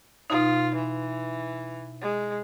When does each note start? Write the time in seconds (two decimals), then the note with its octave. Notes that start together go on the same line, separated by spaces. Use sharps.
0.30 B2 D#4 F4
0.75 E3
2.02 G#3